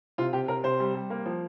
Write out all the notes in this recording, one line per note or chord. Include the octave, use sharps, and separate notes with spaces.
C3 F4
C3 G4
C3 A#4
C3 C5
G3
G3
A#3
F3